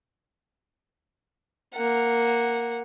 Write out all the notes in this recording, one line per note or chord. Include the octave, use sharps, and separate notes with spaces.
A#3 F#5